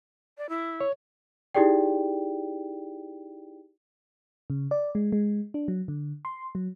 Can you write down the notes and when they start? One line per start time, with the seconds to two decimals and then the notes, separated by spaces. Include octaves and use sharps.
0.38 D5
0.49 E4
0.80 C#5
1.55 D#4 E4 G4 G#4 D5 G5
4.50 C#3
4.71 D5
4.95 G#3
5.12 G#3
5.54 D4
5.68 F#3
5.88 D3
6.25 C6
6.55 F#3